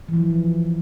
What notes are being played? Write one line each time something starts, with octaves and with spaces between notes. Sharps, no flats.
E3
F3